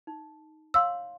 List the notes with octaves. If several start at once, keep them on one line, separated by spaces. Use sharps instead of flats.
D#4
C#5 F5 C6 E6